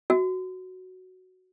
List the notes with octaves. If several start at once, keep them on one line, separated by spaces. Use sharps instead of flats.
F#4